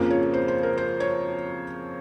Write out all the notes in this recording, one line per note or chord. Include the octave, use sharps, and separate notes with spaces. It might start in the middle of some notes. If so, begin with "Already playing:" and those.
Already playing: F2 C#3 F3 A#3
C#5
C5
C5
A#4
C5
C#5